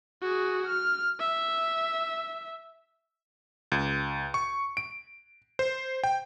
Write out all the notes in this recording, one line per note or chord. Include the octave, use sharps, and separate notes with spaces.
F#4 G#4
F6
E5
C#2
C#6
D7
C5
G5